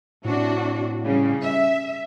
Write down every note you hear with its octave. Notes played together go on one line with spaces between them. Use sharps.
A2 C3 D4 F#4
C#3 G3
E5